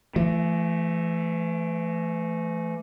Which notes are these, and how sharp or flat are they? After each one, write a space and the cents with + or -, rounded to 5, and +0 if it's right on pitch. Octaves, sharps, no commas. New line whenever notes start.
E3 +40 A3 +0